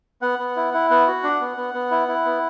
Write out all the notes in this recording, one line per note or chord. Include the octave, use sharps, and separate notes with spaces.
B3 F#5
B3
E4
E4
B3 F#5
F#4
D4
B3
B3
B3
E4
E4
B3